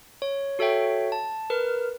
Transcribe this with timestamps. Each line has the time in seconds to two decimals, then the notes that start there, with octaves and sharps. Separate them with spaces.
0.22 C#5
0.59 F#4 A4 C#5 E5 G5
1.12 A5
1.50 A#4 B4 F6